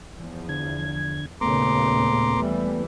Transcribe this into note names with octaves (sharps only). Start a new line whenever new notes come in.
E2 F3
D3 G#6
D#2 A#2 C#3 A3 B3 A#5 C6 D6
E3 G3